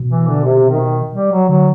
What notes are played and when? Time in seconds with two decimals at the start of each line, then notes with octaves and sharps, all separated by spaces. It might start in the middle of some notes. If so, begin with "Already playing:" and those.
Already playing: B2
0.10 E3
0.28 D3
0.44 C3
0.70 D#3
1.14 G3
1.32 F#3
1.49 D3 F#3